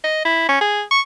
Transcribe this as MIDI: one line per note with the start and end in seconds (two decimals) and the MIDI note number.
0.04 0.23 75
0.25 0.46 64
0.48 0.61 61
0.61 0.82 68
0.91 1.01 85